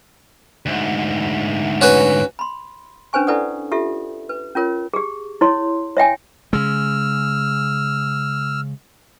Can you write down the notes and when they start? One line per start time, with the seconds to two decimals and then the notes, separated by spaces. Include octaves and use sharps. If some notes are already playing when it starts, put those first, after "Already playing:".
0.66 D2 G#2
1.81 C#4 F#4 B4
2.39 B5 C6
3.13 C#4 D4 B4 C5 G#5 C#6
3.27 E4 A4 B4 D5 F#5 D#6
3.71 F4 G4 A4 E5
4.29 B4
4.55 C#4 F4 A#4 C#5
4.94 G4 G#4
5.41 E4 C#5 C6
5.97 C#5 E5 G5 G#5
6.53 C#3 G#3 E6 F6